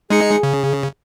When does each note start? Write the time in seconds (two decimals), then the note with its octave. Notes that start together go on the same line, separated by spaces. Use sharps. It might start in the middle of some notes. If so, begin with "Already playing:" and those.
0.10 G#3 D#4 G#4 C#7
0.43 C#3